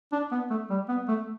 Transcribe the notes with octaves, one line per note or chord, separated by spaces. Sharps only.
D4
B3
A3
G3
B3
A3